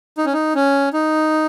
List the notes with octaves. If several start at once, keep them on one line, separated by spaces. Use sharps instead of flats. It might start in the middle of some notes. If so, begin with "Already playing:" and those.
D#4
C#4
D#4
C#4
D#4